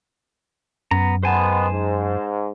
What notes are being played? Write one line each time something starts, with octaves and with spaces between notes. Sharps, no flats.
F#2 B3 A#5
D#3 G#3 B3 C5 G#5 A5
G#2